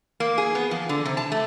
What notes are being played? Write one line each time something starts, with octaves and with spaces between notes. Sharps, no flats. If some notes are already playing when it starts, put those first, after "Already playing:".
A#3
G#4
B3
F3
D3
C3
A5
A3